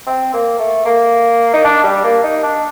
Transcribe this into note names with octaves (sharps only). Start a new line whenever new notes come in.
C4
A#3
A3
A#3
D#4
D4
G3
A#3
D#4
D4